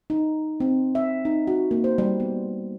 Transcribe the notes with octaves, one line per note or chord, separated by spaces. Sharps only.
D#4
C4
E5
D#4
F#4
A#3
C5
G3
B3